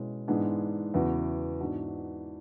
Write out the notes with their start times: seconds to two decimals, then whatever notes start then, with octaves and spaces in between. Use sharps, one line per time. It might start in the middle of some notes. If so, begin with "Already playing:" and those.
Already playing: B2 G#3 C#4 E4
0.28 G#2 E3 G#3 B3 D4
0.94 E2 C#3 E3 B3 F#4
1.60 G#2 E3 B3 D4 F#4